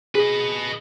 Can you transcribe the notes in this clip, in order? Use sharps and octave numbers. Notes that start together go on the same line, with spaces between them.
G#4 B4 D#5